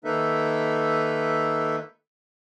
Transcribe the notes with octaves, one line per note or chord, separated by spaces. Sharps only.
D#3 A#3 D#4 A4 B4 E5